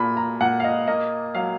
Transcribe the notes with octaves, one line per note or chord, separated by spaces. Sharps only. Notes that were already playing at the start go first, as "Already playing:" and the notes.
Already playing: A#2 B5
A#5
A#2 F#5
F5
D#5
A#3 D#5
F#3 F5